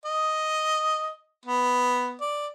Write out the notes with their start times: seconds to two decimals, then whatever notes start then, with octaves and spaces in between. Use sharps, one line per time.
0.05 D#5
1.46 B3
2.21 D5